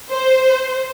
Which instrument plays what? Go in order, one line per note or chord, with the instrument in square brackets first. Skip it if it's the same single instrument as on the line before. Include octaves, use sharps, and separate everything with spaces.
[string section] C5